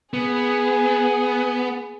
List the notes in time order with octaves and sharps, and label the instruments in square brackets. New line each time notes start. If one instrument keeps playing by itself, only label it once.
[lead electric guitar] B3 [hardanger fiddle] G#4